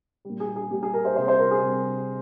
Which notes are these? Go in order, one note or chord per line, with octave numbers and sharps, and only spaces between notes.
A#2 G3
G#4
G#4
A#2 G3 G4
G#4
A#4
C5
C3 G3 C5
C5
A#4
G#4
C3 G3